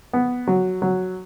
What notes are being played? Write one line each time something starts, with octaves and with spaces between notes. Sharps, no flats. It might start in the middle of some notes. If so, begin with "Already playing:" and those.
B3
F#3
F#3